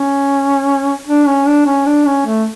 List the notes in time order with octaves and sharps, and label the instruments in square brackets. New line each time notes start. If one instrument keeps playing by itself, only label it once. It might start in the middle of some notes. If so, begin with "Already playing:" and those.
Already playing: [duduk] C#4
D4
C#4
D4
C#4
D4
C#4
A3